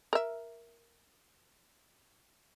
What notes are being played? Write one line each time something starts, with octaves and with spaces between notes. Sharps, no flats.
A#4 E5